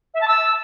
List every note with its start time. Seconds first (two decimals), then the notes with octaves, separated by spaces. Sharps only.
0.14 E5
0.21 A5
0.28 E6